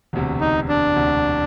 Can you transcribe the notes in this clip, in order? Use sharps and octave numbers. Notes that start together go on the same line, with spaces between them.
E1 D2 C3
D#4
D4
E1 D2 C3